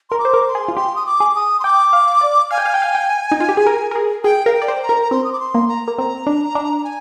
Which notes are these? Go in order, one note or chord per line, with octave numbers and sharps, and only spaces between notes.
A#4 C6
D6
C5
A#4
C6
G#4
F4
G4 C6
D#6
D6
G#4
D#6
C6
G5 D6
F5
D5
F5 G#5
G5
F5
G5
F5
G5
D#4
F4
G4
G#4
A#4
A#4
G#4
G#4 G5
A#4 F5
G5
D5
C5
A#5
A#4
A#5
C4 C6
D#6
D6
C6
A#3
A#5
A#3
C4 A#5
D4
D4
A#5
G#5